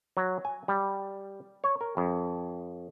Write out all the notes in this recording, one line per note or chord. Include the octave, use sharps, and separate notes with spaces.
F#3
G#5
G3
C#5
A#4
F2